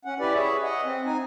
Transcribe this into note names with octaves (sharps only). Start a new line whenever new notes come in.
C#4 F#5
E4 G4 B4 D5
G#4 C#5 E5
D#5 F#5
C4
D#4 G#5